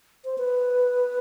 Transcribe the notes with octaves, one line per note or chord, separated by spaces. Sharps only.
C5
B4